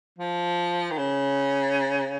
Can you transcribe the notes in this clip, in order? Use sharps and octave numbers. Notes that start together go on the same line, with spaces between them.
F3
D#3
C#3